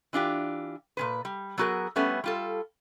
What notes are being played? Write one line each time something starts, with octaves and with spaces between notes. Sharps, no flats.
E3 D4 F4 G4
A#2 C#3 B4
G3
F#3 B3 F#4 G#4 A#4
G3 A3 B3 C#4
G3 F4 A4